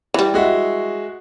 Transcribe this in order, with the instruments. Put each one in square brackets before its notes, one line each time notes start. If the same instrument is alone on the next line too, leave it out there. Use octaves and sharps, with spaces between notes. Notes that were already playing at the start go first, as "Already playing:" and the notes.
[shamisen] E3 G3
[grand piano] G#3 F#4 E5